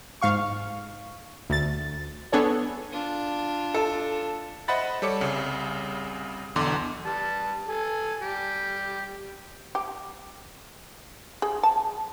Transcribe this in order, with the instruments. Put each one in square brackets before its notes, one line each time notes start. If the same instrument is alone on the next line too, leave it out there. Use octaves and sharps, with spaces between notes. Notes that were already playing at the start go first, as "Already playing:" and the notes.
[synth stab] G#2 F5 C#6
D2 A6
B3 D4 G#4 A4 C#5
[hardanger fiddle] D4 F4
[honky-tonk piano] A4
[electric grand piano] C5 D#5 E5 F#5 B5 A6
G3 A4 C#5 D6 C#7
C2 C#3
B1 E2 D3 C6 D6
[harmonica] G3 A5
A4 G#5
G3 G4
[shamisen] G4
G#4
A5